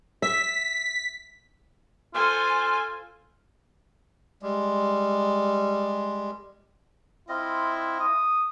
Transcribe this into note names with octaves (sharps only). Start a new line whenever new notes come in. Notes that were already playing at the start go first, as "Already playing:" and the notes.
E5 B6
F4 A4 C5 G#5
G3 G#3
C4 E4 F4 D#5
D#6